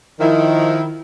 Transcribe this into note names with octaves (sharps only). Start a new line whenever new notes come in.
D#3 F3 E4